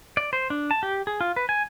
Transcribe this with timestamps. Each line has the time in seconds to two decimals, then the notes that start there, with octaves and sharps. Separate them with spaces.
0.17 D5
0.33 C5
0.50 D4
0.71 A5
0.83 G4
1.07 G#4
1.21 F4
1.36 B4
1.49 G#5